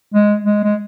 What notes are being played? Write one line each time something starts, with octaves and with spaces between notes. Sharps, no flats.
G#3
G#3
G#3